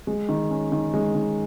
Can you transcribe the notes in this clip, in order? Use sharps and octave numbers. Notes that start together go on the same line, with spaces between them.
G#3
D#3
C#4
D#3
G#3
D#3